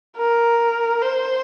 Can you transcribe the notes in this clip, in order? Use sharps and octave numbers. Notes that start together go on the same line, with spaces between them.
A#4
C5